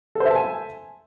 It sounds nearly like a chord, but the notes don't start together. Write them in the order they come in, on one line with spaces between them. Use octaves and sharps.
A4 C5 E5 A5 G#5